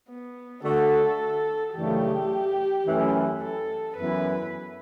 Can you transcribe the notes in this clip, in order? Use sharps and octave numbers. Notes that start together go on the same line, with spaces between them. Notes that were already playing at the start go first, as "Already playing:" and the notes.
B3
D3 A3 D4 F#4 A4
F#2 C#3 E3 A3 D4 G4
F#2 E3 A3 C#4 E4
A4
F#2 E3 B3 E4 B4